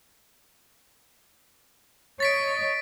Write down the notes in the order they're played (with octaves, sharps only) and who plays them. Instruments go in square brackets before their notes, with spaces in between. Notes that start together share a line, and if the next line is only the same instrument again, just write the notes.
[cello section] C#5 D#5 [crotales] A6 B6 D7